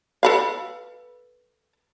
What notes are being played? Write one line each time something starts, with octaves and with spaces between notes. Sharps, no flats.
A4 B4 F5